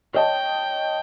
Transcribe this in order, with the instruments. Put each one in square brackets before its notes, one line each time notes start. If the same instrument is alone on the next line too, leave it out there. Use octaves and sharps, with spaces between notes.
[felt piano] C#5 D#5 A5 [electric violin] G5